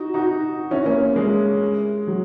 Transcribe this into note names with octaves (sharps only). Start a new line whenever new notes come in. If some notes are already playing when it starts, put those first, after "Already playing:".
Already playing: D#4 F#4
D#4 F#4
C#4 E4
A#3 C#4
G#3
F#3